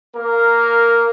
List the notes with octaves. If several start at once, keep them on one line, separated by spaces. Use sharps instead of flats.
A#3 A#4